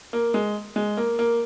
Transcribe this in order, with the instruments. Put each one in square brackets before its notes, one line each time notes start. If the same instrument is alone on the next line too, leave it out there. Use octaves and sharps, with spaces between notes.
[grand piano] A#3
G#3
G#3
A#3
A#3